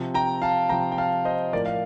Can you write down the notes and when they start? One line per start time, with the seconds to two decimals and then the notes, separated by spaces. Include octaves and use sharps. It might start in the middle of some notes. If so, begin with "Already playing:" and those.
Already playing: C3 F3
0.14 G5 A#5
0.42 F5 A5
0.69 C3 F3 G5 A#5
0.92 G5
0.98 F5 A5
1.25 C5 D#5
1.53 A2 F3 A#4 D5
1.66 F5